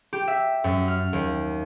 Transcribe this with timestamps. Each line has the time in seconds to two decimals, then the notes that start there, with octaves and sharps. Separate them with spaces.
0.13 G4
0.28 E5
0.64 F#2
0.88 F6
1.13 D#2